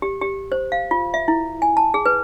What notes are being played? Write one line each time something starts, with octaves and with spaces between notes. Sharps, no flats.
G4
G4
C5
F5
F4
E5
E4
G#5
A5
G#4
B4